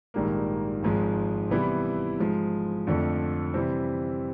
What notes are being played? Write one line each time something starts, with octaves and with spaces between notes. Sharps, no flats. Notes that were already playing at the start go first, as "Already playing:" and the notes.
A#1 G#2 D#3 G3 A#3
G#1 G#2 F3 G#3
C3 E3 G3 B3 E4
G#2 F3 G#3
F2 D3 F3 A3 D4
C3 E3 G3 C4